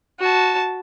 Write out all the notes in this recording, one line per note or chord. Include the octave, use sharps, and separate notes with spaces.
F#4 A5